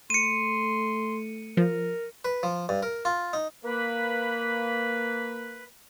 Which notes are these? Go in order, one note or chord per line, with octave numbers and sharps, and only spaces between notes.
A3 C6 C#7 D#7
F3 A#4
B4
F3
G2
A#4
F4
D#4
A#3 B4